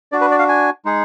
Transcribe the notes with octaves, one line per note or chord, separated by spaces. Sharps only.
D4 F#4 D5
B4
D5
F5
G#5
G#3 D#4 G#4